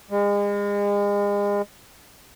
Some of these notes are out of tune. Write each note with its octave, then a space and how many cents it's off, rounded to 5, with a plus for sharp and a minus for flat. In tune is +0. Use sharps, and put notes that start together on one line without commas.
G#3 -35